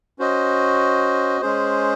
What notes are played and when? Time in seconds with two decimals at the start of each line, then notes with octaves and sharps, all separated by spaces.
0.19 C#4 F#4 C5 D#5
1.41 G#3 C#4 G#4 C5